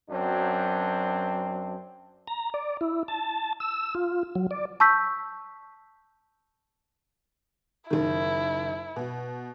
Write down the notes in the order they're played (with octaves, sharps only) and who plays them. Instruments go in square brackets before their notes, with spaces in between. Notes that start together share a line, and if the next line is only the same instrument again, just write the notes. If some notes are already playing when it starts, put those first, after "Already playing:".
[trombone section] F#2 F#3 C4 D4
[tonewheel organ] A#5
D5
E4
A5
E6
F4
F#3
D5
[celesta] A5 C#6 E6 G6 B6
[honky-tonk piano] F#1 D#3 [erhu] E4
[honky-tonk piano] B2